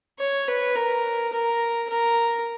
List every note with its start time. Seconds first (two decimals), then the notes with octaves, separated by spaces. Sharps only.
0.19 C#5
0.48 B4
0.75 A#4
1.33 A#4
1.89 A#4